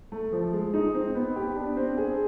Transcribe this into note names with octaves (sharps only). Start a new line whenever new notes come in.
A3
F3
G#3
D#4
C4
B3
G4
D4
C4
G#4